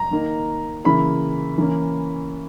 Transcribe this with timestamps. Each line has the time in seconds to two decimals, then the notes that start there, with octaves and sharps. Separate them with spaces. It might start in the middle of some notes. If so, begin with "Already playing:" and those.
Already playing: A#5
0.11 D#3 A#3 D#4
0.84 C#3 E3 A#3 E4 B5
1.58 E3 A#3 C#4